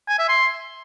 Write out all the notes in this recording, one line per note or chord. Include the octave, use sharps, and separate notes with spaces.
G#5
E5
C6